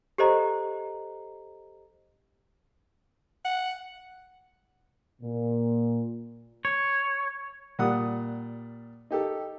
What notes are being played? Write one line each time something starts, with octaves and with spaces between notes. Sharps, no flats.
G4 A4 C5 D#5 A#5
F#5
A#2
C#5
A#2 G3 F#5 D#6
D#4 G4 A4